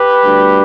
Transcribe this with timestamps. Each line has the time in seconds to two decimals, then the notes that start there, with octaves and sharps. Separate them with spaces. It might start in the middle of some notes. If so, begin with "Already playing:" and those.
Already playing: G4 B4
0.24 D2 D3 G3